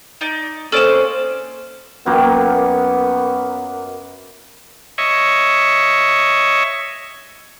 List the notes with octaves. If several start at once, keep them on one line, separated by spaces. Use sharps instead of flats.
D#4 D5
A#3 C4 C#4 A4 C5 D5 D#5 E7
F#2 A#3 B3 G5
C#5 D#5 E5 C#6